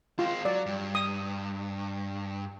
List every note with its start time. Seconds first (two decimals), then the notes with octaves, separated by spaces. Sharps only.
0.19 G#3 C4 F4
0.45 F#3 D5
0.66 G2
0.95 D#6